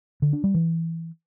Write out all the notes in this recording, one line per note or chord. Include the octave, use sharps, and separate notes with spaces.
D3
D4
G3
E3